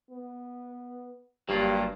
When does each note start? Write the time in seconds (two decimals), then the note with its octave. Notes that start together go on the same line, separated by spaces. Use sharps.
0.10 B3
1.49 F#1 G2 F#3 A#3 F4 G4